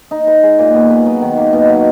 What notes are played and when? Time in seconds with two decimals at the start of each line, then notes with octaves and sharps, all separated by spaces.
0.11 D#4
0.27 B4
0.43 G#3
0.59 A#2
0.74 B3
0.90 B4
1.06 F#3
1.21 D#3
1.37 A#3
1.53 B2
1.69 F#3